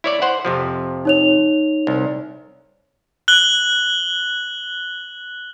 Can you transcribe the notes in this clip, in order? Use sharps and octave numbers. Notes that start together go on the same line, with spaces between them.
E4 C#5 D5
C5 F#5
F2 C3 F3
D#4 C#5 F7
C2
F#6 F#7 G7